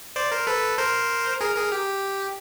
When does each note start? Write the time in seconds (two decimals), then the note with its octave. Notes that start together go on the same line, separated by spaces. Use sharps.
0.16 C5 D5
0.32 A#4 C5
0.47 A4 B4
0.78 A#4 C5
1.41 G#4 A#4
1.56 G#4 A#4
1.72 G4